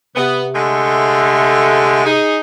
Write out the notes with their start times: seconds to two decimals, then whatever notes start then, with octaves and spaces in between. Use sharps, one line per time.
0.16 C3 B3
0.55 D3 G#3 A3
2.05 D#4 G#4